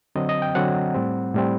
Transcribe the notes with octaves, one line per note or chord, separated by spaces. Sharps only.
D3 F#3 C4 D#5
D#5
G5
D3 F#3 C4 F#5
A2 G3 C4
A2 G3 C4